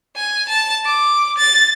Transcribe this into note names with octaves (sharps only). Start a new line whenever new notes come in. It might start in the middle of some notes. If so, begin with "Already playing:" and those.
G#5
A5
D6
A6